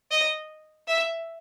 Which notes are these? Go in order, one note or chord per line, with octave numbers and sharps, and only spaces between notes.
D#5
E5